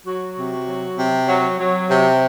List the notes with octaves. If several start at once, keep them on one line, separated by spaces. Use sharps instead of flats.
F#3 F#4
C3
F#3
C3
F#3
F#3
C3